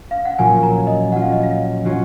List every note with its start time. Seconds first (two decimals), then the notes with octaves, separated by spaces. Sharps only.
0.11 F5
0.25 F#5
0.38 A#2 F#3 C#4 F4 G#5
0.63 A#5
0.87 D#5
1.12 F#3 C#4 F4 F#5
1.22 F5
1.32 D#5
1.43 F5
1.85 F#3 C#4 F4